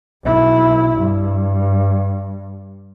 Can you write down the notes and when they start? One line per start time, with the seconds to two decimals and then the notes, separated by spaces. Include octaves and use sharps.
0.24 B1 E4
0.97 G2